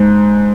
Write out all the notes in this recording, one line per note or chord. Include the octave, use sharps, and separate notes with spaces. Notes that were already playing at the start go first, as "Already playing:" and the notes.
Already playing: G#2